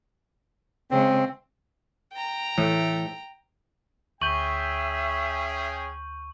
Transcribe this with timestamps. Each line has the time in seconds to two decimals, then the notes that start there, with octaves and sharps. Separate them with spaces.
0.91 C#3 G#3 C4
2.13 G5 A#5
2.58 A2 E3 A3
4.21 D2 C#4 G#4 E5 G5 C#6 G6 F#7